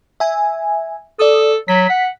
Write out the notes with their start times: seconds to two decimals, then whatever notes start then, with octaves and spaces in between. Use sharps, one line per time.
0.20 E5 G#5
1.19 A4 D5 D#6
1.68 F#3 B6
1.89 F#5